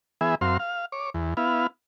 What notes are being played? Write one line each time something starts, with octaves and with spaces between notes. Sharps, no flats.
E3 B3 G#4 E5
F#2 C4 F5 C6
F5
C#5 D6
E2
B3 E4 F5